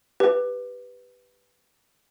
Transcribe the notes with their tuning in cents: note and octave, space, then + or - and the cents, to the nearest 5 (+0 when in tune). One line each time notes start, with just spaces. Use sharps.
G4 +0 B4 +0